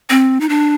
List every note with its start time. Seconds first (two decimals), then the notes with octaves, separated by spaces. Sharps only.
0.10 C4
0.41 D#4
0.49 D4